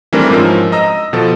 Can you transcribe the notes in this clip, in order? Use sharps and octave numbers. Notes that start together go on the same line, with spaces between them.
E3 G3 A3 C4 D4 A#4
G#2 F3 C#4 A#4 E6
D#5 A#5 E6 A#6
B2 F3 A4